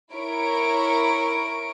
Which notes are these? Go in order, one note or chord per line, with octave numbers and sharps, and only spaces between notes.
E4 A#4 C#5 C#6 D7